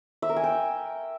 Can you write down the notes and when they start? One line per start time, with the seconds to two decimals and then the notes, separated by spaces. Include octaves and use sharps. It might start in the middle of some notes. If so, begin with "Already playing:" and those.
0.22 E5
0.29 A#4
0.37 G#5
0.44 G5